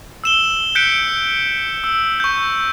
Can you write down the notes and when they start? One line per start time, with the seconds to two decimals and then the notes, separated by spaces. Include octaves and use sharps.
0.24 E6 E7 G7
0.75 F#6 G6 B6 C#7 D7
1.84 E6
2.20 C#6 G6